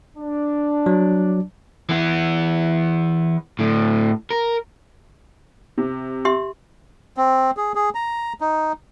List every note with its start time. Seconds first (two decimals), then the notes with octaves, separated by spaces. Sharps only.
0.17 D4
0.86 F#3
1.89 E3 B3
3.59 A2 D3
4.30 A#4
5.78 C3
6.25 G4 E5 C6
7.17 C4
7.57 G#4
7.75 G#4
7.95 A#5
8.41 D#4